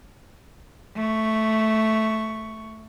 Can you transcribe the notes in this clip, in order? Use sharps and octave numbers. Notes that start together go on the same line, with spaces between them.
A3 C#6